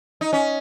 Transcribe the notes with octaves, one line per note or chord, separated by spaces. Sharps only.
D#4
C#4